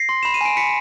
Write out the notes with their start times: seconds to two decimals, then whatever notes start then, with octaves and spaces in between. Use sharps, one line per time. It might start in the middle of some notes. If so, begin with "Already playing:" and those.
Already playing: A#6 C7
0.09 C6
0.23 B5 E7
0.34 D#7
0.41 G#5 D7
0.57 B5 B6 C#7